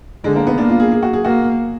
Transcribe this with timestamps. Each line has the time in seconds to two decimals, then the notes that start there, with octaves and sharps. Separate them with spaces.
0.24 D3 G#3
0.36 A#3
0.47 B3
0.58 A#3 D4
0.70 F4
0.80 G#4
0.92 G#4
1.03 F#4
1.13 G#4
1.25 A#3 F#4